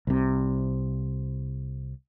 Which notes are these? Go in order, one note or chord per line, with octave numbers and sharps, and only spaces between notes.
C2 C3